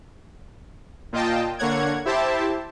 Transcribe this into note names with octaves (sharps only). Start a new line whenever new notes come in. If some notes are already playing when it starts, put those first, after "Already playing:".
A#2 F4 D#5 G5 A5
D3 A#3 C#5 F#5 G#6
E4 G4 C5 E5 A5